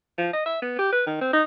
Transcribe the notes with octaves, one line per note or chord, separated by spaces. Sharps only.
F3
D#5
E5
B3
G4
B4
D#3
C4
D#4